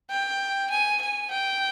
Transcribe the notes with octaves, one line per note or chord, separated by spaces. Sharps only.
G5
G#5
G#5
G5